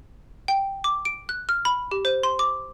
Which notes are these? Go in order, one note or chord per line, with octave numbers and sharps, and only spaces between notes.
G5
D6
D7
F#6
F6
B5
G4
C5
C6
D6